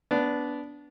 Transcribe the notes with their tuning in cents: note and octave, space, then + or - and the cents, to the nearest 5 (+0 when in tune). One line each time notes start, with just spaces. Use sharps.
B3 +0 D4 -15